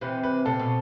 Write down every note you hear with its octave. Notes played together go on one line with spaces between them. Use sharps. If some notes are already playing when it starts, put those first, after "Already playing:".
C3 E3 B4
B4
C3 A4
B2